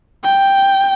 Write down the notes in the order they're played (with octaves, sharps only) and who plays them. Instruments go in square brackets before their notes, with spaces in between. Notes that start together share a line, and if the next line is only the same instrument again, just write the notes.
[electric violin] G5